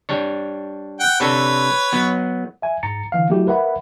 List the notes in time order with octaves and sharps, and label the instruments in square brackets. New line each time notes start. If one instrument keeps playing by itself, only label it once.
[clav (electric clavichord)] G3 D4 C#5
[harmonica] F#5 G5
[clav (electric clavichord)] C3 D4 A4 [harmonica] B4 C#5
[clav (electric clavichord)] F#3 B3
[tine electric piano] E5 G#5
G#2 A#5 A6 C#7
D3 E3 F5
F#3 A3 E4 F#4 G4
A#4 B4 E5 F#5 B5